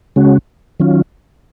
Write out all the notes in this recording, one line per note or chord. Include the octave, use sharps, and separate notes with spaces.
C#3 G#3 C#4 F#4
D#3 F#3 C#4 F4